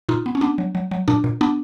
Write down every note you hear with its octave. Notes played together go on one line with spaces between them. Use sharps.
A#2 D#4 F4
B3
C#4
B3 D4
F#3
F#3
F#3
A#2 D4
A#2
B3 D4